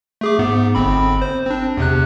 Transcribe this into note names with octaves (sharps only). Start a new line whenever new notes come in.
A3 G#4 D6
G#2 B3
G1 C4 B5
C5
C4 D4
E2 C3 F#6